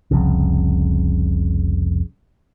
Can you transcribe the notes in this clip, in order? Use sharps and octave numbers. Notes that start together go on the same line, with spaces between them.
F1 C2 F2 C#3